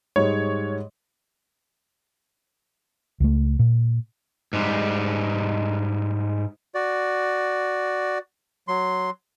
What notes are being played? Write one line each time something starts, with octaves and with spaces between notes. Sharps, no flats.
G#2 G3 G#3 C#5
C#2 A3
A#2
G#2 G3
F#4 D5
F#3 C6